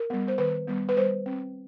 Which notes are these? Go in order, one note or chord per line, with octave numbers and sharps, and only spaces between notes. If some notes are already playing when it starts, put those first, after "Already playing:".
Already playing: A#4
G3 B3
C5
D#3 B4
G3 B3
B4
G3 C5
C4